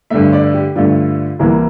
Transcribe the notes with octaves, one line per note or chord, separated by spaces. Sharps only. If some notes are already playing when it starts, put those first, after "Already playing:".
G2 D3 A3 E5
D5
G4
G2 D3 A3 F4
C2 C3 E3 A#3